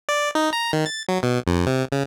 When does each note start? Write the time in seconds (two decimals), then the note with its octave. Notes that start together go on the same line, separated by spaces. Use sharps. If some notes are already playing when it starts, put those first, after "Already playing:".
0.09 D5
0.35 D#4
0.53 A#5
0.73 D#3
0.86 A6
1.09 F#3
1.23 B2
1.47 F2
1.66 C3
1.92 C#3